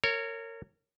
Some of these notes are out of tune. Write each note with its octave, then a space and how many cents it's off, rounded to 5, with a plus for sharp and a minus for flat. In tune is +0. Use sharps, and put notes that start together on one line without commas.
A#4 -30 C#5 +0